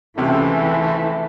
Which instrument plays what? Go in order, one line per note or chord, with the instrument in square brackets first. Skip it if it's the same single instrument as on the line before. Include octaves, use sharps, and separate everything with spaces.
[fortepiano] C#2 C3 [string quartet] E3 [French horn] A3